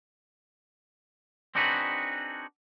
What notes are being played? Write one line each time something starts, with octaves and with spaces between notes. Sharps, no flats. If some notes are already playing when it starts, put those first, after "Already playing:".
C4 D4 D#4 F#4 G#4 B4